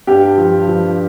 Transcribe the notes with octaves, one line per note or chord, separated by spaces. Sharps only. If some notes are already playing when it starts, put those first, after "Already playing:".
G2 G4
F3
F3